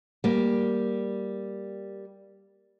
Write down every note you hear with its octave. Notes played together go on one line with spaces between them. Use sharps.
G3 A#3